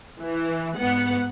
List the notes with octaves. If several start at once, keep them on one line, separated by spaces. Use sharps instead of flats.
E3
G#2 B3 F#5